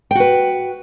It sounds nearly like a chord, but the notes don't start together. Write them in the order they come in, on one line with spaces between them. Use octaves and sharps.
G5 F#4 B4